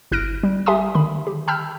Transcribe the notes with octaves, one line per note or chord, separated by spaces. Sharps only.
G1 E4 F6 F#6 A#6 D7
G3
G4 E5 G#5 A5 C6 D#6
D3 D#3 B5
G4
G5 A5 B5 E6 F6 G6